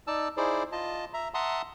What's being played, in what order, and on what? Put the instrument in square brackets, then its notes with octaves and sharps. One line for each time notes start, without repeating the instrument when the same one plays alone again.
[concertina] D#4 D5 A5 E6
D#4 E4 G#4 C5 D5
F4 D#5 A5
E5 A#5
E5 F#5 A5 A#5 C6 D#6